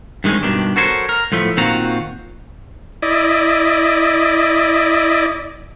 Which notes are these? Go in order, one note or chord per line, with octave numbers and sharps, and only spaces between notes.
G2 D#3 G#3 C4 C#4
G2 B2 D#3 D4
F#4 A4 A#4 C5 C#5
A#4
A2 F3 A3 B3
A#2 D#3 C4 F4 F#4 A#5
E4 D5 D#5